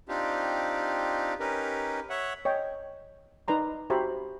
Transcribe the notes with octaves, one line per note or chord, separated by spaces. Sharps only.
C4 D4 D#4 F4 G4
C#4 D#4 G4 A#4 B4
C#5 E5 F#5
C#5 D#5 G5
D#4 B4 D5 A#5 C6
F#4 G4 C5 E5 A#5 B5